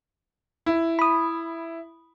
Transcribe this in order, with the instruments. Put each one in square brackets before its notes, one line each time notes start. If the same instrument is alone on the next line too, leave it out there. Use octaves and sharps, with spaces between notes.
[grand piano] E4
[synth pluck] B5 D#6